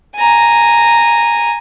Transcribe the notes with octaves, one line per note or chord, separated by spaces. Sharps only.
G#5 A#5